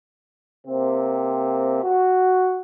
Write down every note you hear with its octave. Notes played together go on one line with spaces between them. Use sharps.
C3 A#3 C4
F#4